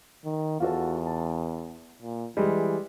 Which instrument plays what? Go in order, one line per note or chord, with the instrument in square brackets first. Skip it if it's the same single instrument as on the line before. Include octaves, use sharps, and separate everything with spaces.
[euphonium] D#3
[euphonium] E2 [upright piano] F4 F#4 A4
[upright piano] A5
[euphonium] A#2
[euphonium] E3 [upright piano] G3 G#3 G4